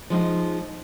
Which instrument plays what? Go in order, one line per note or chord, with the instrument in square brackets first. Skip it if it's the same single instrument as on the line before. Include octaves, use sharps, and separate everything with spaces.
[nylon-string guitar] F3 G#3 D#4